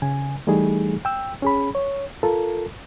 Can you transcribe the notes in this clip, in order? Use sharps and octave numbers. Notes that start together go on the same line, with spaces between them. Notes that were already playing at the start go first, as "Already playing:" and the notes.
C#3 G#5
E3 G3 A3 D#4 G#4
G5 E6
C#4 G#4 B5
C#5
F4 A4 A#4